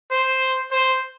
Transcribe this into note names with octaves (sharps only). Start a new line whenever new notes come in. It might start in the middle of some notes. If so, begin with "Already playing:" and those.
C5
C5